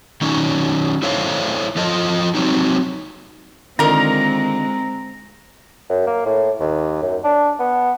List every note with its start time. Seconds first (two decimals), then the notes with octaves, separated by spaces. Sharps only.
0.21 D#3 F#3 C#4 D#4
1.02 E4 A4 C5 C#5 F5
1.76 F3 F4 A4 D#5
2.35 F#3 C4 D#4
3.79 D3 D#3 G#3 C4 F4 A#4 A#5
5.89 F#2
6.07 A#3
6.26 A2
6.60 D#2
7.02 F#2
7.24 D4
7.60 B3